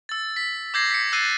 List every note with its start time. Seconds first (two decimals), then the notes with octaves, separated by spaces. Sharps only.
0.09 E6 A6
0.36 B6
0.74 D6 E6 G6 G#6 A#6 C7
0.90 B6 C#7
1.12 E6 F#6 G6 A6 C7 D#7